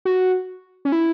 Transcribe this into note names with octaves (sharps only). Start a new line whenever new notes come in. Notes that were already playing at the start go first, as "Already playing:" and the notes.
F#4
C#4
E4